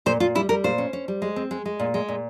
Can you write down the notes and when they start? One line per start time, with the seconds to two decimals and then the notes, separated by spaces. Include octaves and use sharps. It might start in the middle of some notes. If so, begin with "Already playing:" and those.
0.06 A#2 C5
0.20 A#2 F4
0.35 G3 E4
0.49 G3 A#4
0.64 A#2 C5
0.78 C#4
0.93 C#4
1.08 G3
1.22 G#3
1.36 C4
1.51 G#3
1.65 G#3
1.79 A#2
1.94 G#3
2.08 A#2